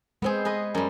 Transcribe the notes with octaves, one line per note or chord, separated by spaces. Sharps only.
G#3 B3 C4 G#4 C5
G#4 B4 D#5
F#2 G3